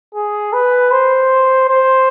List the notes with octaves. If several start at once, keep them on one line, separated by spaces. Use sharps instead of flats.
G#4
B4
C5
C5